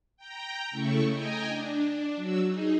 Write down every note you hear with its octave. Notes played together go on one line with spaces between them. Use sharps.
G5 A#5
C#3 A3 E4 A4 C#6
D#5 G5 G#5 A#5
D4
F#3 F#4 E6
D#4 G#4